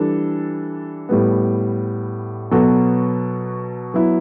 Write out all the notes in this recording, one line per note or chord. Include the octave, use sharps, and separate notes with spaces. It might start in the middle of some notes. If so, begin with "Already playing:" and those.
Already playing: E3 G3 D4 A4
A2 G3 B3
B2 F#3 B3 F#4 A4
F#3 B3 E4